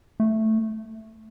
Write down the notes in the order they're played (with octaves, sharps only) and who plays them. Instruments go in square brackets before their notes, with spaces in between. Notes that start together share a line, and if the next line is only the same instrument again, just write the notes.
[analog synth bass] A3